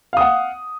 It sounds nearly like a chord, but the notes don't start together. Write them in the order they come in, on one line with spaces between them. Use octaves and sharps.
F5 D#6 F#5